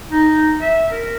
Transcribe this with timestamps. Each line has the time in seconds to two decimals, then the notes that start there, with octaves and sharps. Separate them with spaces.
0.11 D#4
0.61 E5
0.92 A#4